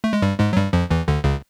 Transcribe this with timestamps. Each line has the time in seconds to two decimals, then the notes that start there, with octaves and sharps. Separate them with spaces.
0.04 A3
0.13 G#3
0.22 G2 G3
0.40 G#2 G#3
0.53 F#3
0.56 G2 G3
0.73 F2 F3
0.91 E2 E3
1.08 D2 D3
1.24 C#2 C#3